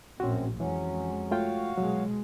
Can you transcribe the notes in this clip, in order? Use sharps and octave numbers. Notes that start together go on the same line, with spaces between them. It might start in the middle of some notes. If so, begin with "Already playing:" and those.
A#1 F#2 A2 C4 C#4 F#4
F2 E3 F#3 G#3 C#4
A3 F4 F#4 C#5 F5 G5
B2 F#3 G#3